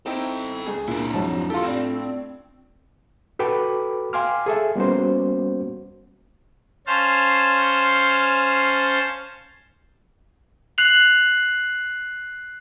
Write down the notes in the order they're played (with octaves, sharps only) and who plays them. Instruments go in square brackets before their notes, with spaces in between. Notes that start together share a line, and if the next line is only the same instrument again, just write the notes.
[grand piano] C4 D#4 E4 [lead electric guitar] A4 G5
[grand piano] C#2 G#4
[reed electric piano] A#2 [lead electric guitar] D4 E4
[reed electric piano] F2 G#2 F#3 [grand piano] A5
[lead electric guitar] D#4 G4 [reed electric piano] F4 A4
[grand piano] A2 D4 [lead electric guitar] C4
[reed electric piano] F#4 A4 B4 G5 B5 D6
F5 G5 G#5 C6 D6 F6
G#4 A4 E5
G3 A#3 B3 C#4 F#4 C5
[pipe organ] C#4 C5 F5 A5
[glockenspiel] F#6 C7 F7 F#7